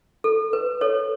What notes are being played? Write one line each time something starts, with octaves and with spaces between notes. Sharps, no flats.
A4
B4
A4 C#5